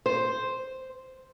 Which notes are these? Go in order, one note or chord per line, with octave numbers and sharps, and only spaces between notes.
C5